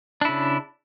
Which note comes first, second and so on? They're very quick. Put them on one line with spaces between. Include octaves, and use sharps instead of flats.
D4 E4 C#3